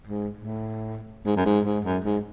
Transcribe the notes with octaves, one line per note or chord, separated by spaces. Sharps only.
G#2
A2
G#2
F#2
G#2
G#2
F#2
G#2